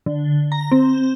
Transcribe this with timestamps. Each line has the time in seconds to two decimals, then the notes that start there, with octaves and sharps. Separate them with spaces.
0.06 D3
0.52 A#5
0.72 C4